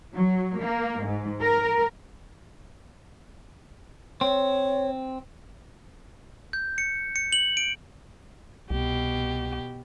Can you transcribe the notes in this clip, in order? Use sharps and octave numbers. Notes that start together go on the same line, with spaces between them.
F#3
A#3
G#2
A#4
C4 C#5
G6
C#7
C#7
F#7
D7
C2 B2 G4